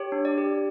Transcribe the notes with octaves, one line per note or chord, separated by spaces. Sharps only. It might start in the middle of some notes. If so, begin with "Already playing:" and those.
Already playing: G4 C#5
D4
D5
G4